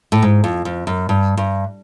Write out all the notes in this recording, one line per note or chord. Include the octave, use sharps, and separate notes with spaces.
A2
G#2
F2
F2
F#2
G2
G2